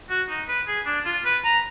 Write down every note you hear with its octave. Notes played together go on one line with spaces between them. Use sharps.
F#4
D#4
B4
G#4
D4
F4
B4
A#5